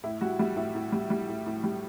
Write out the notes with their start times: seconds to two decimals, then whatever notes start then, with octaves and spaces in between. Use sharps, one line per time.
0.03 A2 E4
0.21 G3 F#4
0.39 G3 E4
0.57 A2 E4
0.75 A2
0.92 G3
1.10 G3
1.28 A2
1.46 A2
1.64 G3